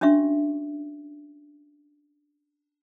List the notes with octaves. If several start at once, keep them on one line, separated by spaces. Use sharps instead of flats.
C#4 D4 F#4 E5 C#6